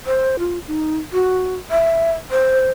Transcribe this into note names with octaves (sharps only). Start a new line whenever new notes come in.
C5
F4
D#4
F#4
E5
C5